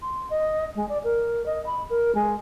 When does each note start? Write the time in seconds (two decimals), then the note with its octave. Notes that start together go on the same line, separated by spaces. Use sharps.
0.02 C6
0.30 D#5
0.76 G#3
0.89 D5
1.04 A#4
1.46 D#5
1.66 B5
1.90 A#4
2.15 G#3